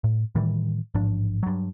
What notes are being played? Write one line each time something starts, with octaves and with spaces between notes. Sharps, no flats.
A2
A2 D#3 E3 G3
A1 G#2 F3 D4
G2 F#3